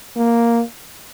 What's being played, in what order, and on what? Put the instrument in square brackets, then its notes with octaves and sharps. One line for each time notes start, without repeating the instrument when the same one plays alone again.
[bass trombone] A#3